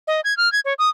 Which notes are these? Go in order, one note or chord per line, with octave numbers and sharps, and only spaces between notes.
D#5
G#6
F6
G#6
C#5
D#6